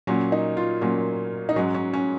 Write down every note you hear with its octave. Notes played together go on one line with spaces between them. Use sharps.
A#2 F#3 C#4
D#4
F4
A#2 F#3 C#4
D#4
G#2 F#3 C#4
C#4
C#4